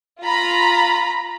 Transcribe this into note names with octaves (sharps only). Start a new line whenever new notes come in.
F4 A#5 B5